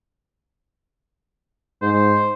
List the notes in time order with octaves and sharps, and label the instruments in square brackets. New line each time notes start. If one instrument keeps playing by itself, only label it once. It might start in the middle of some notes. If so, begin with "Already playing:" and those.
[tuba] G#2 [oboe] C5